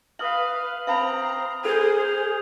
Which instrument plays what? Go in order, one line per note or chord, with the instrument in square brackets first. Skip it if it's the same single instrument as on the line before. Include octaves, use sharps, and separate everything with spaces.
[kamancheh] B4 F5 [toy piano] E5 [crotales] D#6 F6 F#7
[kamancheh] C4 A#5 [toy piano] E5 F5 B5
[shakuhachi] G#4 [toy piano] A4 [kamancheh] C5 [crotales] G6 G#6 F7